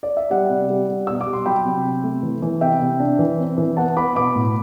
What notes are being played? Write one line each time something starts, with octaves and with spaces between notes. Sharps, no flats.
D5
E5
G3 D5 F#5
C3
G3
G3
B2 E6
D6
G3
C6
F#3 G5 B5
C3
C3
A3
E3
E3
C3 E5 G5
C3
D4
E3
C4
E3
B3 F#5 A5
B3 B5 D6
B2 B5 D6
A2